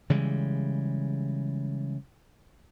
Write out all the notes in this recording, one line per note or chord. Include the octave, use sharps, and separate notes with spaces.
C#3 E3 G3 G#3